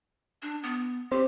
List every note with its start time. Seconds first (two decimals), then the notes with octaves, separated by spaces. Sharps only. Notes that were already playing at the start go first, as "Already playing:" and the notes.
0.42 D4
0.63 B3
1.12 C4 G4 C5